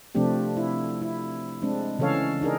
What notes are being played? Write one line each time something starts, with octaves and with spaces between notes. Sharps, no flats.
C3 F3 A3 C4 D4 G4
E4
E4
G#3 C4 D4
C#3 E3 C#4 A4 C#5 F5
D4 D#4 G#4 A#4